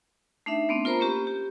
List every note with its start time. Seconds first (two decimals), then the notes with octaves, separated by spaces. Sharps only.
0.46 A3 D4 D#4 E5
0.69 A3 B3 C4 D4
0.85 F4 A#4 C5 A#5 B5
1.00 A#3 C#4 G4
1.27 G4